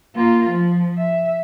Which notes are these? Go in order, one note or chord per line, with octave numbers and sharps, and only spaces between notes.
A#3 F4
F3
E5